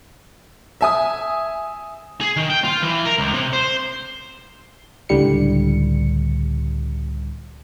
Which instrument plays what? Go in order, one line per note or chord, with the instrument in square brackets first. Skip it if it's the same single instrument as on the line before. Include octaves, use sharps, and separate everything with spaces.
[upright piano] E5 G#5 D#6
[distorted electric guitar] G#4
D#3
G5
F4
E3
A#4
C#2
C3
C5
[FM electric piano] C#2 A2 D3 G3 C#7